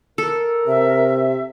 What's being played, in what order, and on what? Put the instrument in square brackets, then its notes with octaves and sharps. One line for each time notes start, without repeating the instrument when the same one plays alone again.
[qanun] A4 [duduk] A#4
[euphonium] C3 [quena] E5